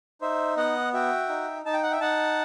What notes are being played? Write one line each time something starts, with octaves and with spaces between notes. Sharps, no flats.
D#4 C5 E5
B3 D#5 F#5
F#4 E5 G5
D#4
D#4 A5
G5
F#5
E5 G5
D#4 F#5 A5